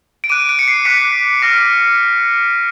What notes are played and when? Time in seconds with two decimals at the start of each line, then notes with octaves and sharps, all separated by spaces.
0.24 D7
0.29 D6 F#6 D#7
0.49 D7
0.59 C#7
0.68 C7
0.85 D6 F#6 B6
1.42 D6 F6 A#6